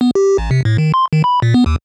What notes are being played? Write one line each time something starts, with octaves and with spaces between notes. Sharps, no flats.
B3
G4
A1
C3
A2
D#3
C6
D#3
B5
A#2
B3
D#2